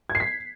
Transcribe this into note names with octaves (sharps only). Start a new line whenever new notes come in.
G#6
C7
B6